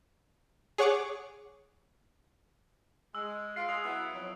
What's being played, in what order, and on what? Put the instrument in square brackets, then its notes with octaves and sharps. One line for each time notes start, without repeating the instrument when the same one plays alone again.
[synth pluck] G#4 C#5 F#5 C#6 D6
[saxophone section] G#3 [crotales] E6
[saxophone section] F4 [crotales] C7 D7
[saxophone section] G#3 [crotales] D#6
[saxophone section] F#3 B3 E4
[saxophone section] F2 F#3 [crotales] D7